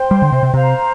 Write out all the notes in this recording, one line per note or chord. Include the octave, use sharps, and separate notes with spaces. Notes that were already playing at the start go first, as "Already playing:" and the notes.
Already playing: C5 G5 C6
G3
D3
C3
C3
C3 C5 F5 A#5